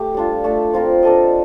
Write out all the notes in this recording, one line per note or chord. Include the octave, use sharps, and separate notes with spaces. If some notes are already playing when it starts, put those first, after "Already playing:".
Already playing: A3 G4
G3 D4 F4
A3 D4 A4
C4 F4 A#4
D4 A4 D#5